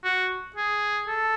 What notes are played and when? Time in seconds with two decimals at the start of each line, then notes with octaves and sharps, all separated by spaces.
0.04 F#4
0.56 G#4
1.07 A4